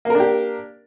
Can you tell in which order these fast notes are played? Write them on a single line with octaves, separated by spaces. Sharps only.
A#3 A#4 D4 G4